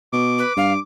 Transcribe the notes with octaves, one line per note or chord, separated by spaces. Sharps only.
B2 D6
B4
G2 F5